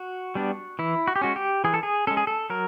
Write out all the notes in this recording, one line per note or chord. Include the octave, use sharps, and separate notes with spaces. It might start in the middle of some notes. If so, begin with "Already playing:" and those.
Already playing: F#4
G3 B3 D4
E3 E4
F#4
G4
G#3 C#4 F#4
G4
E3 G#4
A4
G#4
G#3 C#4 A4
G#4
A4
F#3 A#4